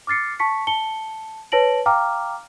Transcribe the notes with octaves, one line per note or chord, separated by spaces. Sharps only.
D6 F6 A6 C7 C#7
A5 C#6 B6 C#7
A5 C#7 G7
B4 C#5 A5 A#6 D7 F#7
F5 G5 A#5 D6 F6